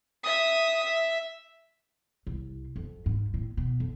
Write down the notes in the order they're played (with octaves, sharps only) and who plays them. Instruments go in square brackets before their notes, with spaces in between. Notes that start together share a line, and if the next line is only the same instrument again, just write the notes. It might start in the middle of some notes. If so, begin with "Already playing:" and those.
[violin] E5 D#6
E5
[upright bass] C2
F2
G#2
A2
B2
F2